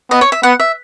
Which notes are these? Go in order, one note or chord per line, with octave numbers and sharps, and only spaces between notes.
B3 D#5
C#5
E5
B3 F#5
E5